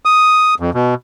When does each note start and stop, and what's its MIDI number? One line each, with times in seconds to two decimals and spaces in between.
0.05 0.54 87
0.60 0.70 41
0.74 0.94 47